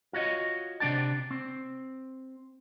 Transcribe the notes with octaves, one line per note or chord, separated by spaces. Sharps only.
F4 F#4 C#5 D#5
C3 A#3 D4 G5 A5
C4